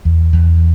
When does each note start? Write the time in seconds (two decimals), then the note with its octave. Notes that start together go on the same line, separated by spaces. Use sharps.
0.05 E2
0.33 E2